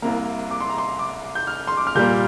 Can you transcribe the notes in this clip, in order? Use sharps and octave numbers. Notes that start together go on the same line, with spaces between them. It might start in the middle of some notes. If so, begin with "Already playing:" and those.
C2 C3 A#3 A#5
D6
C6
A#5
C6
D6
G6
F6
C6
D6
F6
A#2 G3 A#3 G6